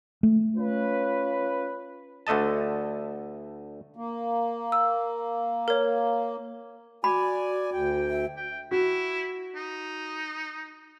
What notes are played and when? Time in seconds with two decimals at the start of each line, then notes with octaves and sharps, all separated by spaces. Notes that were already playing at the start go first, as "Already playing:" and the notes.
0.23 A3
0.56 C#4 F4 B4
2.27 D2 D3 A3 D#5 A5
3.96 A#3
4.72 E6
5.68 A#4 C#5
7.04 F#4 D5 G#5 B5
7.73 D2 G5
8.11 E5
8.37 G5
8.71 E4 F#4
9.56 D#4